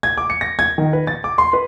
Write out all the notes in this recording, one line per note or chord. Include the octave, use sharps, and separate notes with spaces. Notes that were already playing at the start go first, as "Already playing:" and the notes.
G#6
D6
C#7
A#6
G#6
D#3
B4
A6
D6
C6
B4